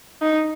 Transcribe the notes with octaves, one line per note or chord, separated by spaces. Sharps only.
D#4